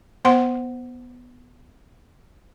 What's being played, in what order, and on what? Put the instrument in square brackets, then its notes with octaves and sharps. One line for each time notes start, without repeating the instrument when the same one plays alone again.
[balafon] B3 C5 F#5 C6